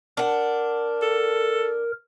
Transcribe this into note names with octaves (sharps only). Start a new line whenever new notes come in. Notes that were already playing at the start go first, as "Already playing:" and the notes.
D4 A#4 F#5
A4